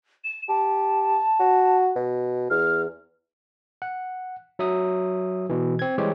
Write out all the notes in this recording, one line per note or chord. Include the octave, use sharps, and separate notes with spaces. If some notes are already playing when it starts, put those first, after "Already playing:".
E7
G4 A5
F#4
B2
E2 F6
F#5
F#3 E5 D#6
B2 E3
C4 G#6
E3 G3 G#3 G4 C5 C#5